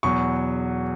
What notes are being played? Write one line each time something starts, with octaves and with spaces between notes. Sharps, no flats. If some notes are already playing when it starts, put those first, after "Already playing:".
E2 B2 F#3 C#6